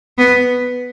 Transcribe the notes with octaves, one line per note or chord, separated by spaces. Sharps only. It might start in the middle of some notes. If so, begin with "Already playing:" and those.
B3